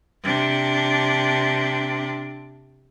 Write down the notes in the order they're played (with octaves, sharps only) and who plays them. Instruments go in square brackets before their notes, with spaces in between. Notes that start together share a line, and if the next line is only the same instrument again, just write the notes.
[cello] C3 D4